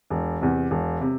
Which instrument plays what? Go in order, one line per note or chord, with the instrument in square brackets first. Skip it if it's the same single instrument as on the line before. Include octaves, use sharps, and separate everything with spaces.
[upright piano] E1
E2 C3
E1
C3